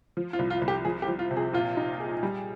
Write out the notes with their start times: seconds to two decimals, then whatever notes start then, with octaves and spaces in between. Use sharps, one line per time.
0.17 F3
0.33 F4
0.39 C2
0.50 F4
0.62 C2
0.68 G4
0.85 F3 G#4
1.02 G4
1.08 F3
1.19 F4
1.31 C3
1.36 G#4
1.53 A#2 F4
1.77 D#4
2.00 G#4
2.23 G3